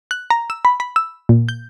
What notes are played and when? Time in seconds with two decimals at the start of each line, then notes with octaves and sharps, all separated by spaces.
0.11 F#6
0.30 A#5
0.50 E6
0.65 B5
0.80 B5
0.96 E6
1.29 A#2
1.49 G6